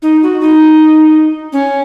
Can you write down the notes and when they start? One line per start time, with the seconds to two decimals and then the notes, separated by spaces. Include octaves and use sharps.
0.02 D#4
0.23 F#4
0.41 D#4
1.53 C#4